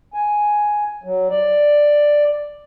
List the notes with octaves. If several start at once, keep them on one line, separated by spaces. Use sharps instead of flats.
G#5
F#3
D5